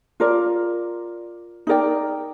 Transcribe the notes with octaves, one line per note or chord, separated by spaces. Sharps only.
F4 A#4 D5
D#4 A#4 D5 G5